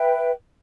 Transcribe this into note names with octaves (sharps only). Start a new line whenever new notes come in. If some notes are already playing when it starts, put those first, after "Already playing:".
Already playing: B4 E5 G5